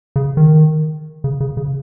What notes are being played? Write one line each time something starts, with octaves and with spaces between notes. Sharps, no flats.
C#3
D#3
C#3
C#3
C#3